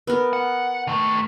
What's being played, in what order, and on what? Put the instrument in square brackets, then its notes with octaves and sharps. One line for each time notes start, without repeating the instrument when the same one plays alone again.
[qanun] B3 A#4
[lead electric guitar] F#5
D#3 A3